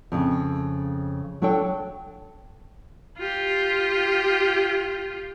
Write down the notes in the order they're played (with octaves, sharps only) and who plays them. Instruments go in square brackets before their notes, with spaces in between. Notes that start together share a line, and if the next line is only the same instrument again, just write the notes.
[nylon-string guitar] F2 C#3
F#3 D4 A4 C#5 G5
[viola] F4 G4